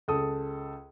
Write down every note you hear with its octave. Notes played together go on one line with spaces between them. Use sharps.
C#2 A4 D#6